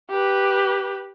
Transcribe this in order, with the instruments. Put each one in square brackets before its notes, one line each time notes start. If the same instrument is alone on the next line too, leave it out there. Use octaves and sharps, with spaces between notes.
[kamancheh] G4 B4